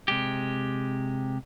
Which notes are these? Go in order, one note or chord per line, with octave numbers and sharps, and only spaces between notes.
C3 G#3 G4